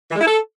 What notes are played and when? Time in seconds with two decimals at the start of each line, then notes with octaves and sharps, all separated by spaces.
0.10 E3
0.16 G#3
0.21 E4
0.26 A4